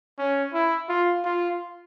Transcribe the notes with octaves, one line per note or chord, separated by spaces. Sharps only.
C#4
E4
F4
F4